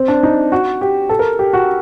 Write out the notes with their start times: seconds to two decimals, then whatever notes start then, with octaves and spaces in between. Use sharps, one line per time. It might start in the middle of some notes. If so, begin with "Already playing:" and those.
Already playing: C4
0.08 D4
0.23 D#4
0.52 F#4
0.81 G4
1.09 A4
1.19 A#4
1.39 G4
1.53 F#4